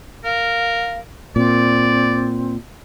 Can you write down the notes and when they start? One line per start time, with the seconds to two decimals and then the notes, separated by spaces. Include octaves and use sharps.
0.24 A#4 F5
1.36 A#2 C4 D5